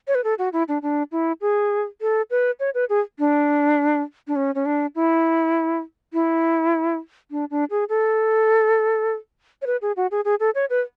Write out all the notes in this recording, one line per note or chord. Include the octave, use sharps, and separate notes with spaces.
C#5
B4
A4
F#4
E4
D4
D4
E4
G#4
A4
B4
C#5
B4
G#4
D4
D4
C#4
C#4
D4
E4
E4
D4
D4
G#4
A4
C#5
B4
G#4
F#4
G#4
G#4
A4
C#5
B4